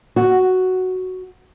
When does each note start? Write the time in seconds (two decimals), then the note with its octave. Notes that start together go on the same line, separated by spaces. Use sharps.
0.16 F#4